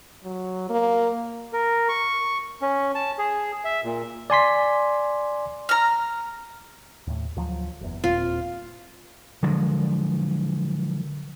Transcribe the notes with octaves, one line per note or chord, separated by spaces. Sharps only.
F#3
A#3
A#4
C#6
C#4
A5
G#4
E5
A#2
D5 G#5 C6 B6
A#5 F6
D#2 A2
D2 F3 F#3
F#1 E2
D#1 A#2 C4 F4
D3 F3 F#3 G#3